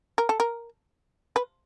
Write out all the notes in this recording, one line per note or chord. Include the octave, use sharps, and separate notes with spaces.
A#4
A4
A#4
B4